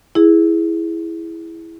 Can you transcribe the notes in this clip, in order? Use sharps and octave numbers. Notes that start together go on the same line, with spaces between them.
E4 G#4